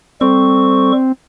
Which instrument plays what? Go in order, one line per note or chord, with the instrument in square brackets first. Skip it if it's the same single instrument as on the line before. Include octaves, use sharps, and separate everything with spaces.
[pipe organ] G3 A4 C#6 [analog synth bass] C4